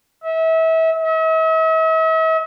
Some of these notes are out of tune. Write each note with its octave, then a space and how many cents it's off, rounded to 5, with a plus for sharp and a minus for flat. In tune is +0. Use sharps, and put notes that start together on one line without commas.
E5 -30
E5 -45